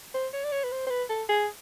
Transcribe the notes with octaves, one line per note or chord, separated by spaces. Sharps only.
C5
C#5
D5
C#5
B4
C5
C5
B4
A4
G#4